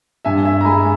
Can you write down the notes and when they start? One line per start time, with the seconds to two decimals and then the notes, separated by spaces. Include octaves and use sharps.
0.25 G2 E5 G#5
0.45 E5 G#5
0.61 A#5
0.65 G#3 G#5 B5